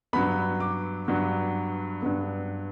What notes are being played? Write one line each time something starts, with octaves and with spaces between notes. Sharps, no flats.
G2 F#3 B3 B5
D6
G2 F#3 B3
G2 F#3 B3